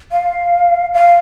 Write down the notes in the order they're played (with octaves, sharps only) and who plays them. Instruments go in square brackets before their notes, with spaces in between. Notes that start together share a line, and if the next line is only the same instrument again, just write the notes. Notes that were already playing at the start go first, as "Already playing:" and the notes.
[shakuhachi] F5
F5